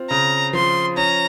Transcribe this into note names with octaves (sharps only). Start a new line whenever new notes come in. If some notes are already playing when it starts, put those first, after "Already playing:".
Already playing: C4 F4
C#3 A#5
F3 C6
C#4 A#5